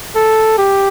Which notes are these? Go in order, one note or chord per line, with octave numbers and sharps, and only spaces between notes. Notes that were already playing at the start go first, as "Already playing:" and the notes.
A4
G4